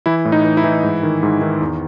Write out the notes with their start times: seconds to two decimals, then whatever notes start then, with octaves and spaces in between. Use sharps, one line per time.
0.06 E3 E4
0.25 A2
0.32 D#4
0.45 E3
0.57 E4
0.64 E3
0.83 G#2
1.03 D#3
1.23 G#2
1.41 D#3
1.61 E2